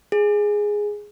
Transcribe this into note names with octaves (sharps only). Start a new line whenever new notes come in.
G#4